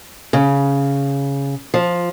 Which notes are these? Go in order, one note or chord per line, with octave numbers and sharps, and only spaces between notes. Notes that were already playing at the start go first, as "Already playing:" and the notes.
C#3
F3